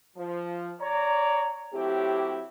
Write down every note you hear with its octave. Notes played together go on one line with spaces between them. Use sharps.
F3
C#5 D5 A#5
A2 F#3 C4 E4 G4